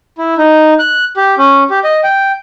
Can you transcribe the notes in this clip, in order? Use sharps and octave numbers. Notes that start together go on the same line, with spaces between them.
E4
D#4
F#6
G4
C#4
G4
D#5
G5